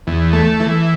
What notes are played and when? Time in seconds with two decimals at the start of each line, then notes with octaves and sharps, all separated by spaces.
0.07 E2
0.33 A3
0.60 E3